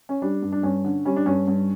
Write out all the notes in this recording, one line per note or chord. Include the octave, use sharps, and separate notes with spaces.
C#4
G3 D4
G2
D4
G2 C#4
D3
G3 C#4
D4
G2 C#4
G2